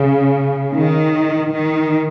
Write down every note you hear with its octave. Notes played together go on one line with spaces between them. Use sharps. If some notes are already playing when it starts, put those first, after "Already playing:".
Already playing: C#3
D#3
D#3